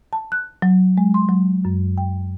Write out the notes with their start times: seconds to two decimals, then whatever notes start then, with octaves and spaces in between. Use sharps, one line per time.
0.13 A5
0.32 F#6
0.62 F#3
0.98 G#3
1.14 C6
1.29 F#3
1.65 F#2
1.98 G5